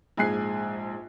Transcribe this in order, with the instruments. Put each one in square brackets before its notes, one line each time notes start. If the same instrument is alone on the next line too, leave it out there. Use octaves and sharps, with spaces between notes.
[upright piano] A#1 G#2 G#4 G#5 F#6 C7